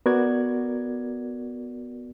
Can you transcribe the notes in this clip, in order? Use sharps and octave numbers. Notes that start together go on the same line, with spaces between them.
B3 F#4 A#4 D5 G#6